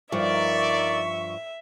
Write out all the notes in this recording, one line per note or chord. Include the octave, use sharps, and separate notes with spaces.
G2 F3 D#4 A#4 D5 E5 C#6